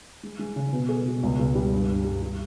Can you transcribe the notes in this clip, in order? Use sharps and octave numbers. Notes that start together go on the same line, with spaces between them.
G#3
G#3
C#3
B2
G#4
B2
C#2
C#2
G3
G2
G2
G3
G3